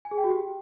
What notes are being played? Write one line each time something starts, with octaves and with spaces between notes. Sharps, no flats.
G#5
G#4
G5
F#4
G4